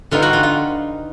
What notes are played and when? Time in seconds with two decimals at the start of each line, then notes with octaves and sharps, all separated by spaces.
0.11 D3 G3 B3 D#4 F4
0.22 F#4
0.33 F4
0.43 F4